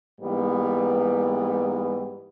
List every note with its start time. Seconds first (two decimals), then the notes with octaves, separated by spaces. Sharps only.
0.20 G#2 E3 G3 A#3 B3